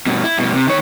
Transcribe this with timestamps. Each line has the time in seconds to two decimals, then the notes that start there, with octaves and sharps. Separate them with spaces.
0.07 G2 B2
0.24 E4
0.38 G2 B2
0.53 C3
0.68 D#3 C#5